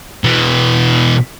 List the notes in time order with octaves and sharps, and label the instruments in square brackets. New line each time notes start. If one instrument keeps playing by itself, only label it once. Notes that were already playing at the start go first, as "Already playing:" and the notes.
[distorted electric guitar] B2 E3